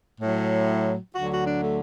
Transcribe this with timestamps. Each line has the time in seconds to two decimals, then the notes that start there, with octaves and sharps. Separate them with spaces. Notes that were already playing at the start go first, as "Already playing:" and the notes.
0.21 A2 F#3
1.14 D2 D3 F#3 F#4
1.30 F#4
1.46 D4
1.61 A3